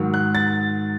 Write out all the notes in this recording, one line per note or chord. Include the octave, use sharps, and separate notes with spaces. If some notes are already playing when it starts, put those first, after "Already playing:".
Already playing: G#2 D#3 F#3
F#6
A6